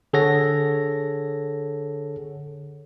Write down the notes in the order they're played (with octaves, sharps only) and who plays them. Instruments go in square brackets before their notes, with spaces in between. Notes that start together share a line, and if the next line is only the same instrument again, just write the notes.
[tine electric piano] D3 G#4 A4 C#5 F#5 A#6